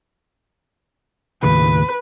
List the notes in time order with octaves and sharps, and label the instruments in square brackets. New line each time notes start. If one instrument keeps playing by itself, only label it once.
[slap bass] D#2 A2 C#3 [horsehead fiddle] B4